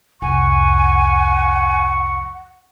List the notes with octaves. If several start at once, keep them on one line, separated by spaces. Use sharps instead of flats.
C2 F2 F#5 G#5 C#6